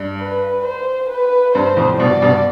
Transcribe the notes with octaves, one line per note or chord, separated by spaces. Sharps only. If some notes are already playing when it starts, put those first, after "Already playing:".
Already playing: G2
B4
C5
B4
G2 C5
F2 A2
G2 B2 D5
G2 B2